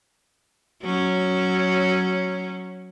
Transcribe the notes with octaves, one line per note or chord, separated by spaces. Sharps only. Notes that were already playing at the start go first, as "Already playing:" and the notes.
F#3 C#4